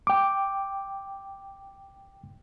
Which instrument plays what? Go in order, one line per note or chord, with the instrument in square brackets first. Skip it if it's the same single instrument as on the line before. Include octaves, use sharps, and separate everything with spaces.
[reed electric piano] G5 D6